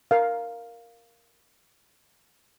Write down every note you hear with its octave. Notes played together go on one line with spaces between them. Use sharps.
A#4 F5